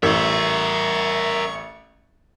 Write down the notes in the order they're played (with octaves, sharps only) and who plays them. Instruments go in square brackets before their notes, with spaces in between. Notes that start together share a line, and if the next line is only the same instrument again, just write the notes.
[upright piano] A1 [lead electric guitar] A#4 E5 [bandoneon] C#6